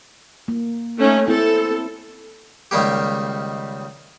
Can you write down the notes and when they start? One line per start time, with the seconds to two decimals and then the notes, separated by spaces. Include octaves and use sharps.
0.48 A#3
0.98 A3 C#4 D#4
1.28 C4 E4 A4
2.71 C#2 D#3 G3 A#3 G4